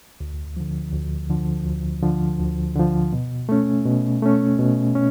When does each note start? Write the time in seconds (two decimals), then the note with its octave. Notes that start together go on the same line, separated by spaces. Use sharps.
0.20 D2
0.57 D3 F3
0.93 D2
1.30 D3 F3
1.66 D2
2.02 D3 F3
2.40 D2
2.75 D3 F3
3.13 B2
3.49 A3 C#4
3.85 B2
4.22 A3 C#4
4.59 B2
4.95 C#4